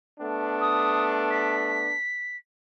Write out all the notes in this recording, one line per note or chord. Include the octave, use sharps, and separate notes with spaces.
A3 B3 D4
D#6
B6